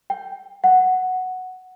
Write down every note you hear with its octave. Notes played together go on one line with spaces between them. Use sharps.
G5
F#5